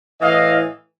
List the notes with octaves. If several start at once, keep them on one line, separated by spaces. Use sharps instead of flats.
A2 E3 D#5 F5